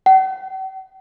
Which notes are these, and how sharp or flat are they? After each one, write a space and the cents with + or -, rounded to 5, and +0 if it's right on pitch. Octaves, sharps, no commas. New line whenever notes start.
F#5 +45